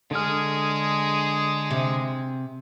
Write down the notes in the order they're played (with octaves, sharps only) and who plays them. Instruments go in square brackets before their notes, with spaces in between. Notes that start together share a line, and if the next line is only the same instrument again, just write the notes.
[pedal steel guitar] D3 F6 [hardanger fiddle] G#3 G#4
[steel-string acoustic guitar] C3